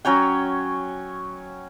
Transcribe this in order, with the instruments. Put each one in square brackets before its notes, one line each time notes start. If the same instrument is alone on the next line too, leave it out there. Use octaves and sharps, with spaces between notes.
[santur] F#3 C#4 C#5 G5